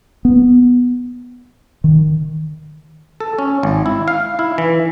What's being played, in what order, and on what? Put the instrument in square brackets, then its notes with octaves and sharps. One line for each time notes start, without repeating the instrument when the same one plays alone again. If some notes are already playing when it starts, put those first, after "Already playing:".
[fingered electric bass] B3
D#3
[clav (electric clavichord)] A4
C#4
G#1
E4
F5
E4
E3